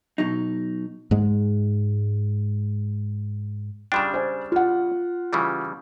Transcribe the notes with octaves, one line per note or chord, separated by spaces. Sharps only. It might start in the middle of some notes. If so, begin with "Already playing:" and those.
B2 F#3 D#4
G#2 G#3
C#3 G3 D4 G5 C6 E7
C5 G#5
F4 F#5
C#3 E3 G3